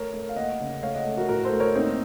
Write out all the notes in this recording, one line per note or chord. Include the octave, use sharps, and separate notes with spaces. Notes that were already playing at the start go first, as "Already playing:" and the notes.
Already playing: A3 A#4 C#5
A3
F5
A#3 D#5 F#5
C#3
A3 C#5 F5
D#5 F#5
A3
F#4 A#4
A2 F#4 A#4
A4 C5
A3
A#4 C#5
A#3 C4 D#4